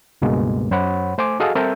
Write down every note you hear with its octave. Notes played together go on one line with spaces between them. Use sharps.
C#2 G2 B2 G#3 A#3
F#2 C5 C#5 F#5 B5
A3 C5 G#5 D6
F#4 G#4 A4 D#5 F5
G3 C4 A4 A#4 E5 G6